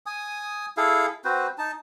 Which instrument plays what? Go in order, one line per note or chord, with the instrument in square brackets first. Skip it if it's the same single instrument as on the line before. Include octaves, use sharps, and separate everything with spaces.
[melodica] G#5 D#6
E4 G#4 A4 F5
C4 F#4 B4 C5
D#4 A5